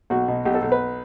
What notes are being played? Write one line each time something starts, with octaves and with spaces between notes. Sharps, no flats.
B1 F#4
B2
B1 G4
A4
B1
B4